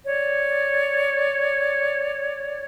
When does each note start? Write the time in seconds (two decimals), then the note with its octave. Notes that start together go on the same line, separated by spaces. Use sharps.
0.06 C#5 D5